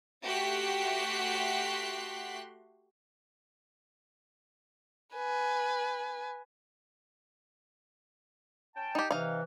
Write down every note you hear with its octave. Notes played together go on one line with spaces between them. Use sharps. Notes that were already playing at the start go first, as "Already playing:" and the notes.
A3 F#4 G4 C6 F#6 B6
B4 G#5
C#4 G5 A5
D#4 G4
C3 E3 D#4 F5